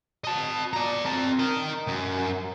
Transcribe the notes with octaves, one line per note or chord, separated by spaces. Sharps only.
D#5 A5
D5 A#5
C4 A5
A#4 D#5
F#2